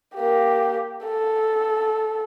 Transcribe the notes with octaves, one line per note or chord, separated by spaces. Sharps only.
A#3 G4
A4